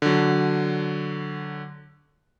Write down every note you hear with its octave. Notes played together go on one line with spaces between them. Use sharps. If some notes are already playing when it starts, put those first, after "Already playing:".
D3 F#3